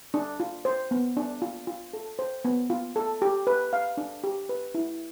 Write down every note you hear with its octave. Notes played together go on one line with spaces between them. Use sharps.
D4
F4
C5
B3
D4
F4
F4
A4
C5
B3
F4
A4
G4
B4
F5
D4
G4
B4
E4